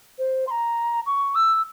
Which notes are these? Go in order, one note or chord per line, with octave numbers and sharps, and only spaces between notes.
C5
C6
A#5
C#6
E6